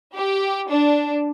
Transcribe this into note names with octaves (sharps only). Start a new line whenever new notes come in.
G4
D4